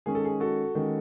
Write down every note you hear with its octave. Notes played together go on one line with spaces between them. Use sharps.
D#3 G#3 C#4 G#4
A4
G#4
F#4 A4
D#3 G#3 C#4